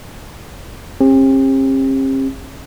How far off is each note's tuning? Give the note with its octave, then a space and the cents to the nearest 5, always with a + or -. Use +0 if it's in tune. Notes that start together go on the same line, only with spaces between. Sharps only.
C4 +45 G4 +35